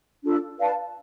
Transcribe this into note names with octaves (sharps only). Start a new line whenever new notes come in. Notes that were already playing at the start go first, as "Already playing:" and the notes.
D4 F4 A4
B4 D5 F5 A5